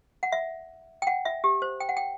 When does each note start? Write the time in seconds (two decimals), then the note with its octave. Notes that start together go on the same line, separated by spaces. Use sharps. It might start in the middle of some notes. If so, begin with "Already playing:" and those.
0.23 F#5
0.32 E5
1.02 G5
1.07 F#5
1.25 E5
1.44 G4
1.62 C5
1.80 G5
1.89 F#5
1.97 G5